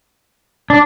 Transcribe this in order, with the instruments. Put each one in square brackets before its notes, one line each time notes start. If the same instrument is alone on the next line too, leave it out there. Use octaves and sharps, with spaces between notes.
[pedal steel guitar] D4